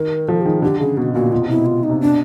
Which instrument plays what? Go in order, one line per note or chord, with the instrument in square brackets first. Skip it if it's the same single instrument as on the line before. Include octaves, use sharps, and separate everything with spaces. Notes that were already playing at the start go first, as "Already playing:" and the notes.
Already playing: [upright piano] D#3 [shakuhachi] A#4
[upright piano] F3 [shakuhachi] A4
[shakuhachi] G4
[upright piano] D#3 [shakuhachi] G#4
[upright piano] D3 [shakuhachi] G4
[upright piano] C#3 [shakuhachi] G#4
[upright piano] B2 [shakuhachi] F#4
[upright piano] A#2 [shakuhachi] F#4
[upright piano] B2 [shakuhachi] F4
[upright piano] C3
[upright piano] B2 [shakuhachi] E4
[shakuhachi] F4
D#4
[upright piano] C3
[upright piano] B2 [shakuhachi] D4